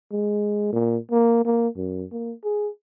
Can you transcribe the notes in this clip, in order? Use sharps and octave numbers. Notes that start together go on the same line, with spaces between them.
G#3
A#2
A#3
A#3
F#2
A#3
G#4